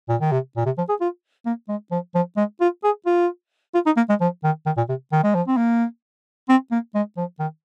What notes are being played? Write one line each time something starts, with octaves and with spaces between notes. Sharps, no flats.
A#2
D#3
C3
A#2
C3
F3
G#4
F4
A#3
G#3
F3
F3
G#3
F4
G#4
F4
F4
D#4
A#3
G#3
F3
D#3
D#3
A#2
C3
D#3
G#3
F3
C4
A#3
C4
A#3
G#3
F3
D#3